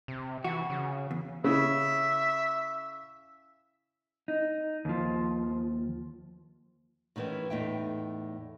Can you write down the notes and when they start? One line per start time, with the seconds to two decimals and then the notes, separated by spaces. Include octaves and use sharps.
0.08 C3
0.44 E3 F#4
0.70 C#3
1.11 E2
1.44 C#3 E4 E5
4.28 D#4
4.85 D#2 F3
7.16 A2 D#3 E3 G#3 C#4
7.50 E2 A2 A3 D#4 E5 G5